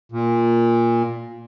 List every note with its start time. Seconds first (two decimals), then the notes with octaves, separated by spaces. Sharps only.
0.12 A#2